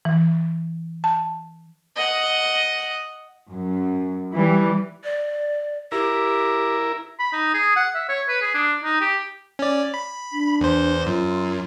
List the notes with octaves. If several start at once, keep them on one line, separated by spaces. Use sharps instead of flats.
E3
A5
D#5 F#5
F#2
E3 G3
D5
E4 G4 A#4
B5
D#4
G#4
F#5
E5
C#5
B4
G#4
D4
D#4
G4
C#4 D5
B5
D4
E2 C5
F#2 F4